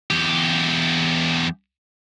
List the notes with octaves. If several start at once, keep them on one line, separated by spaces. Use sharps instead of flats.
E2 G4